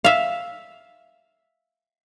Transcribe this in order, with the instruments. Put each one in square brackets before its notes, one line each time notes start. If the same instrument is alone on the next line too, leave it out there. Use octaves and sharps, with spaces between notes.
[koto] E5 F5